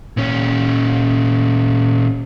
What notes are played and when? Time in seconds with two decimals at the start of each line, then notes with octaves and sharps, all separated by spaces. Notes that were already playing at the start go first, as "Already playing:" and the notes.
0.17 A#2 C#4